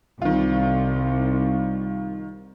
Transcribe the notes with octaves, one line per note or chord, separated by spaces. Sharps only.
C2 D#3 F4